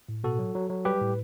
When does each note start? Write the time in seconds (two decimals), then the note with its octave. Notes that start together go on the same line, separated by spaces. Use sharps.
0.09 A2
0.24 B2 F#4 A4
0.39 F#3
0.55 F#3
0.70 F#3
0.85 G3 G4 B4
1.01 A2